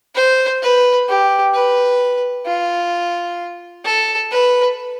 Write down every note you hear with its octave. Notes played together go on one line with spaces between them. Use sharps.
C5
B4
G4
B4
F4
A4
B4